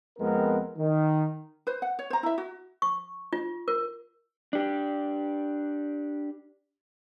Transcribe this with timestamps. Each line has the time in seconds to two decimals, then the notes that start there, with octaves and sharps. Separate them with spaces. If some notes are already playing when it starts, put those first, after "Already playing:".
0.19 F2 G#3 B3 C4 A#4
0.77 D#3
1.67 B4 C5
1.82 F#5
1.99 C#5
2.10 C5 A#5
2.23 E4 E5
2.38 F#4
2.82 C#6
3.33 F4
3.68 A#4
4.53 D4 G4